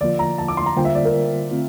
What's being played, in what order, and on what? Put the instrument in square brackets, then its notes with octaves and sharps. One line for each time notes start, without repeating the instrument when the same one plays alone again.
[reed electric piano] D3 F3 A#3 F4 [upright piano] D5
[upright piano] A#5
A5
D6
C6
A#5
[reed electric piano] D3 G3 A#3 F4 C5 [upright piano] G5
[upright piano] E5
D5
A#4
[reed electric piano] D3 A3 C4 F4